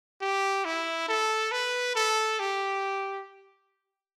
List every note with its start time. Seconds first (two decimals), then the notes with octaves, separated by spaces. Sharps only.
0.21 G4
0.65 E4
1.08 A4
1.52 B4
1.96 A4
2.40 G4